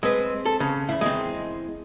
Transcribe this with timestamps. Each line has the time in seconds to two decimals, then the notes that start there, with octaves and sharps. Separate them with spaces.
0.03 G#3 C4 B4
0.46 A4
0.60 C#3
0.89 E2 E4
1.01 G#3 C4